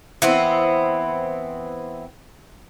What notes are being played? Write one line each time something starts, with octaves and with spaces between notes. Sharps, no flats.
E3 B3 C4